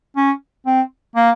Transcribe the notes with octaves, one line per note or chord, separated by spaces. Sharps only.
C#4
C4
A#3